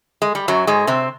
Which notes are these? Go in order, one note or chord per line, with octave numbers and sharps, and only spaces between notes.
G#3
G3
F#2 F#3
G#2 G#3
C3 C4